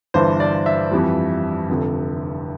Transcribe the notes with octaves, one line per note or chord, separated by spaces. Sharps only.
G1 G2 E3 C5
D5
E5
F2 E3 G3
F1 F2 D3